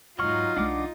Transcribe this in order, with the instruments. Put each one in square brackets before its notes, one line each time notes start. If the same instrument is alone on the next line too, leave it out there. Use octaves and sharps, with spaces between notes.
[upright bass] E2 G#2 [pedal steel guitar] F#3 C#6 [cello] D#4 F4 [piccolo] F6
[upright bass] C2 F3 [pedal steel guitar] D4 F#5 D6